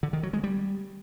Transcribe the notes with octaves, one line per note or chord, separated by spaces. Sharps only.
D3
D#3
F#3
G#3
G3